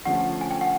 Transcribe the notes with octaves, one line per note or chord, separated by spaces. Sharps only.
D3 F3 A3 C#4 F#5
G#5
G5
F#5